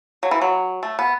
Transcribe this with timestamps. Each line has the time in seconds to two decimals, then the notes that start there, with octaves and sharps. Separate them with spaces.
0.23 F#3
0.31 E3
0.42 F#3
0.83 A3
0.99 B3